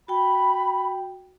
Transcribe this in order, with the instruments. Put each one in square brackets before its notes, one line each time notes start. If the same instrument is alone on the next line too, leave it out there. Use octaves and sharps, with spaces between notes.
[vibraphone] F#4 G5 [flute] B5